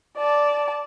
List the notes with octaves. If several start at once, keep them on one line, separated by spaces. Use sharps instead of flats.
D5 A5